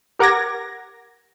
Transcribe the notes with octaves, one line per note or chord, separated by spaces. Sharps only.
G4 A#4 F#5 D6 G#6 A#6